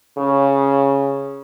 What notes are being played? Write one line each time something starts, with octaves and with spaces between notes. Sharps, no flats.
C#3